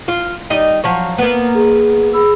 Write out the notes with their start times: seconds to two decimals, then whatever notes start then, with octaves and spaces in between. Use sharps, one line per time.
0.08 F4
0.50 G3 D#4 D#5
0.84 F3 F#3 C#5
1.18 A#3 B3
1.55 G#4
2.13 G#4 B5 E6